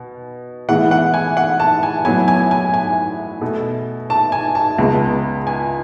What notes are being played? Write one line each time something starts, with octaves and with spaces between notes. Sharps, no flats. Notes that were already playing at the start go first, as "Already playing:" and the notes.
Already playing: B2
A2 E3 G#3 B3 F#5
F#5
G#5
F#5
A5
G#5
A2 F#3 B3 G#5
G#5
G#5
G#5
B2 A3
A5
G#5
A5
C#2 C#3 G#3 B3
G#5